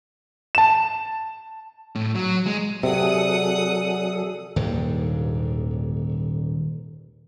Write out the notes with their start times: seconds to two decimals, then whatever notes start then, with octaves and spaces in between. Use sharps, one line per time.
0.55 A5 E7
1.95 A2
2.15 F#3
2.46 G#3
2.83 C3 F#3 G#4 A4 D5 F#5 D#6
4.56 D#1 D#2 G#2 D3